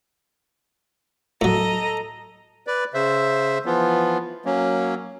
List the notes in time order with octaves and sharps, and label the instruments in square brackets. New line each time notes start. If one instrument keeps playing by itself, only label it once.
[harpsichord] A2 F#3 [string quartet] A4 D#5 A#5
[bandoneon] B4 D5
C#3 C5 E5
E3 F3 B3 F4
F#3 A#3 C#4